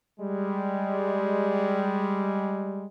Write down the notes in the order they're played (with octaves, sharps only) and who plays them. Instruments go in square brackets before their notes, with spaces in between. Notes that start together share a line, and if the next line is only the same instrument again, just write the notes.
[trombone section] G3 G#3